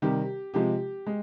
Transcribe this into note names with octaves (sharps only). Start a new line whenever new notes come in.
C3 D#3 G3 G4
C3 F3 G#3 G4
G#3